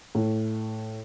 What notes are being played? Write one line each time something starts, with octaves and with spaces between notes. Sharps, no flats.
A2